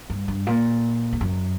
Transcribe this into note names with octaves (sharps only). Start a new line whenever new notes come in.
G2
G2
A#2
E2
F#2